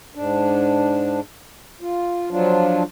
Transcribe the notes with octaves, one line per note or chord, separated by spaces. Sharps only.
G#2 D4
F4
F3 F#3 D4 F4